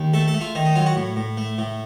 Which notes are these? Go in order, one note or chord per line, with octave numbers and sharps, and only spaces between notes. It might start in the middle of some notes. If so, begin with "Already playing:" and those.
Already playing: D#2
A3 A4
A4
A3
F4
D#3 D#4
D#4
F#3 F4
F#4
A2
A2
A3
A2